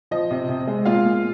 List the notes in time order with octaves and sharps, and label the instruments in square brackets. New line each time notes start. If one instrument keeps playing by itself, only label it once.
[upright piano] F3 D#5
C3
C3
G#3
A#2 F4 F5
A#2